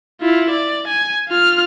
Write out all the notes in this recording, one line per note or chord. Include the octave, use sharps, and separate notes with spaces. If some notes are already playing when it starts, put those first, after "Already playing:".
E4 F4
D5
G#5
F4 F6